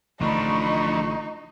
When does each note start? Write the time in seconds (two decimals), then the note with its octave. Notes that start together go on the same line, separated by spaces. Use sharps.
0.20 A1 D3 F3 A3 D4 D#4 B5 C#6